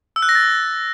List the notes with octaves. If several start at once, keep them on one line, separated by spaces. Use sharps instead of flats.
E6
F#6
A#6
A6